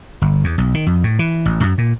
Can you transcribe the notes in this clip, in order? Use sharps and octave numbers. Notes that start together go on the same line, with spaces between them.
G1
E2
B1
D#3
F2
A2
E3
A1
F#2
A#2